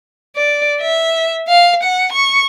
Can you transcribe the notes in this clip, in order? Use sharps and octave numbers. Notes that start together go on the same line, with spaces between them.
D5
E5
F5
F#5
C#6